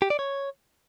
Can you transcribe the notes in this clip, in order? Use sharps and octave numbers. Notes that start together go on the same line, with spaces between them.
G4
D5
C#5